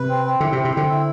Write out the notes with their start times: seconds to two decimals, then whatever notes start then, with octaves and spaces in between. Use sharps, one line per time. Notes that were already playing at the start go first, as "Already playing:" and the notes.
Already playing: C3 B4
0.09 C4
0.25 C4
0.40 D3 E4
0.52 C3
0.56 C4
0.65 C3
0.73 D3 C4
0.90 E4